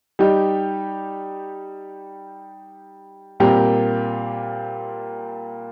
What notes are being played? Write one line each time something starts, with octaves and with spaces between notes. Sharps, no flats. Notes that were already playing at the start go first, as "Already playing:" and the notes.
G3 D#4 G4
A#2 G3 C4 G4 A#4